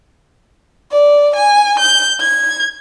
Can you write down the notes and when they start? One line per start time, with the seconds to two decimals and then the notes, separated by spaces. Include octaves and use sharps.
0.90 D5
1.34 G#5
1.78 G6
2.19 G#6